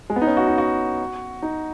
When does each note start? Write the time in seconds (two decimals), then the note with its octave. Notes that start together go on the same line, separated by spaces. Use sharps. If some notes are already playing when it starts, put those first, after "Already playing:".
0.10 G#3
0.16 B3
0.22 D#4
0.27 C#4
0.37 F#4
0.47 D#4
0.58 F#4
1.42 D#4